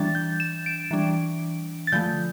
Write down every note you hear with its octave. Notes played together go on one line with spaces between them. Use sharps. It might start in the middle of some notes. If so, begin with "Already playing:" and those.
Already playing: E3 G3 D4 A6
G6
E7
D7
E3 G3 D4
A6
D3 F3 A3 G6